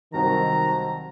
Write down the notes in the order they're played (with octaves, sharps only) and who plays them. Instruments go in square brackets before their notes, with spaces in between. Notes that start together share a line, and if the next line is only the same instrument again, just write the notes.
[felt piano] C2 F#3 C4 [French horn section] D#3 [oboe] A#5